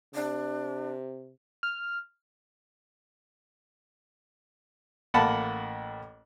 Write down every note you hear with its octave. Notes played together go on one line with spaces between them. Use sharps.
C3 D4
F6
A1 A#3 F#5 A5 B5